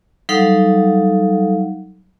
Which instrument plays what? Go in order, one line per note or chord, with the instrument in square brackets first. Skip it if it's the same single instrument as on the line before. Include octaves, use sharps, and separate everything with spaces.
[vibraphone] F#3 G3 D#4 A4 F5 F#5